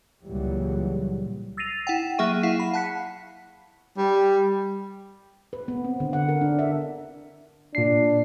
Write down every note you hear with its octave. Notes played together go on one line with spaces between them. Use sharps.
C#2 A#2 E3 F#3 G3
E6 A6 A#6 C7 D#7 F7
E4 F#5 G5
F#3 A#3 G#4 E5 C#6 D#7
E4 F5 F#5 C7
B5
F#5 A5 F#6 B6 C#7
G3
B4
B3
C4
D3
F#5
A#4
D4
E5
A#2 D4 C7